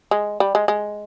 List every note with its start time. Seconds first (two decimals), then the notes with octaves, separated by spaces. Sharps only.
0.11 G#3
0.40 G3
0.55 G#3
0.68 G#3